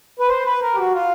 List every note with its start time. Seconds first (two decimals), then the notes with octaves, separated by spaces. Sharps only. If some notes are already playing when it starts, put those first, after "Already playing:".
0.19 B4
0.29 C5
0.45 B4
0.61 A#4
0.74 G4
0.78 F#4
0.94 F4